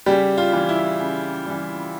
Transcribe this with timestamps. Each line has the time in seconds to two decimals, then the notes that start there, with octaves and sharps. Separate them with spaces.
0.06 C#3 G3 G4
0.37 F4
0.53 E3 G3
0.69 E4
1.00 C#3
1.46 E3 G3